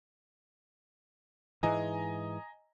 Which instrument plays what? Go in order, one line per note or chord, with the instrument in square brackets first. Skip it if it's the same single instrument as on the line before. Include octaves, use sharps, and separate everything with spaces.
[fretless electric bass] G#2 E3 G#3 [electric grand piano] D#5 G#5 A#5